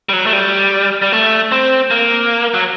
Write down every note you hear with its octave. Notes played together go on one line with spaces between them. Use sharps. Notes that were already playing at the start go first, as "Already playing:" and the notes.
G3
F#3
A3
G3
G3
A3
C4
A#3
F#3